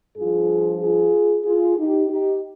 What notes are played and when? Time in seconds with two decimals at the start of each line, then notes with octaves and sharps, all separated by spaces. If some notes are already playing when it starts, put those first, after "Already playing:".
0.17 G2 F3 F4 G#4
0.81 F4 G#4
1.45 F4 G#4
1.77 D#4 G4
2.09 D#4 G4